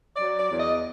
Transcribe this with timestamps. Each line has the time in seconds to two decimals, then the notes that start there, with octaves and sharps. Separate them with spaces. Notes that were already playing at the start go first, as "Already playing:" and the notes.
0.14 D5
0.21 F#3
0.37 D5
0.51 E2
0.58 D#5